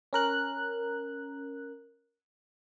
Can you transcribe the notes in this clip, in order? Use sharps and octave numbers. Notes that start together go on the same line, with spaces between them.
C#4 A#4 F#6